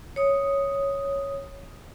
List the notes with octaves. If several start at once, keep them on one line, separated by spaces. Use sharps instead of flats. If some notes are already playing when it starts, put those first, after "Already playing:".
C#5 D#6